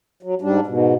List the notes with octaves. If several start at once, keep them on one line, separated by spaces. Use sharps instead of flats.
F#3
G#2 G3 D4
G#2 B2